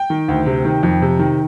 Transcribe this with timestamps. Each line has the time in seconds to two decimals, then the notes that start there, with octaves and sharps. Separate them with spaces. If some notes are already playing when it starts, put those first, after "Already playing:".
Already playing: G5
0.10 D#3
0.28 D2
0.46 C3
0.65 D#3
0.83 F2
1.02 C3
1.19 D#3